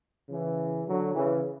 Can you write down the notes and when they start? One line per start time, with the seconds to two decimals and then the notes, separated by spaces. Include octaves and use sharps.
0.30 C#3 E3
0.86 D3 F#3
1.14 C#3 E3